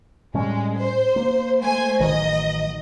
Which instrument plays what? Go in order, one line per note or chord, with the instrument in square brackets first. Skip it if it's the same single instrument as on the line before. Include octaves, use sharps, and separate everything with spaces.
[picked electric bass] A2 G3 C#4 [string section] G#3
[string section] C5
[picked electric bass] A#3
[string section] A3 C5 G#5
[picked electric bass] A1 D#3 F#3 [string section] D#5